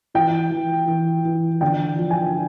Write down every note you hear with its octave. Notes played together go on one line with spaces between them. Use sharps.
E3 G5
E3
E3
E3
D3 G5
F3
G#5